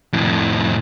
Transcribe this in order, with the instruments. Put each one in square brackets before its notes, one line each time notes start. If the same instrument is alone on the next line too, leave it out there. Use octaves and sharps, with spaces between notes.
[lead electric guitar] F2 A2